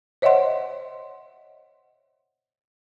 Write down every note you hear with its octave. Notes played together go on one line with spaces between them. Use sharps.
C5 C#5 D#5 E5 F#5 C6